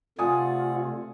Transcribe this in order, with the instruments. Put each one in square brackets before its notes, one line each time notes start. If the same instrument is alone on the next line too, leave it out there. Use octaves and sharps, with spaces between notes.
[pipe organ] C3 A3 [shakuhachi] F4 [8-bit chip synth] D5 F#5 [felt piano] G#5 D#6